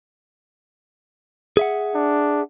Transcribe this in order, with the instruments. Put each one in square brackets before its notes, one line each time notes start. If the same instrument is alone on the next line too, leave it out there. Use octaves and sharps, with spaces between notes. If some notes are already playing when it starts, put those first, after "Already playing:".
[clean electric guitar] G#4 E5 F#5
[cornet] D4